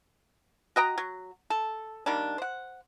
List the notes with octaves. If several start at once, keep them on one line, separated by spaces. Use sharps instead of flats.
F#4 D#5 G5 A#5
F#3
A4
D#3 G3 A#3 D4
C5 F#5